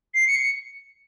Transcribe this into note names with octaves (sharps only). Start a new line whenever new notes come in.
C7
C#7